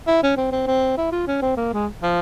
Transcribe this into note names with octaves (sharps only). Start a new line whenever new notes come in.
E4
C#4
C4
C4
C4
E4
F4
C#4
C4
A#3
G#3
F3